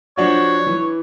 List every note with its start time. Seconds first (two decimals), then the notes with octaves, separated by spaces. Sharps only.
0.17 F3 D4 F#4 C#5
0.67 E3